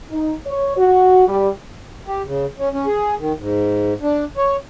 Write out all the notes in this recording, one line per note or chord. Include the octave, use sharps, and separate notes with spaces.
D#4
C#5
F#4
G3
G4
C#3
C#4
C#4
G#4
D#3
G#2
D4
C#5